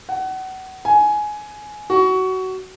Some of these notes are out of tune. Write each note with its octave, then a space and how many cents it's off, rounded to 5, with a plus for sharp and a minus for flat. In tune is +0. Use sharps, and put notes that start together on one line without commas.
F#5 +30
G#5 +15
F#4 +20